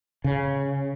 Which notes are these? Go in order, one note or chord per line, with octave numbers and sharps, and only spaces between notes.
C#3